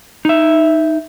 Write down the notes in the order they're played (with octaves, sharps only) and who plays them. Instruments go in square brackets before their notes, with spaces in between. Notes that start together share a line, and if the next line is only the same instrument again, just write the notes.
[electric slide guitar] D#4 E5